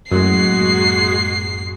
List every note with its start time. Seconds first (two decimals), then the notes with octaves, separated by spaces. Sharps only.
0.12 F#2 A2 G#3 A#3 F#4 C7